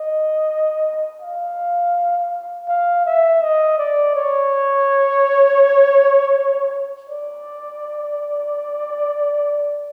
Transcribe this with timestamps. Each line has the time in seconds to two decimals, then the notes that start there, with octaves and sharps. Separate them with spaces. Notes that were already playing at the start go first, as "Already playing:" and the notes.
Already playing: D#5
1.22 F5
2.68 F5
3.05 E5
3.42 D#5
3.78 D5
4.15 C#5
7.10 D5